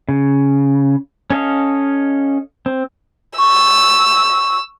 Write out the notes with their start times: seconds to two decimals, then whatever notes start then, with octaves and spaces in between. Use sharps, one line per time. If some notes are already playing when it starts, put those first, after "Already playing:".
0.09 C#3
1.30 C#4 A4 D#5 F5
2.66 C4
3.38 C#6 E6